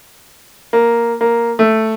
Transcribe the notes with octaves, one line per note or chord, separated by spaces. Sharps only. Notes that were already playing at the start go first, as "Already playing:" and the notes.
A#3
A#3
A3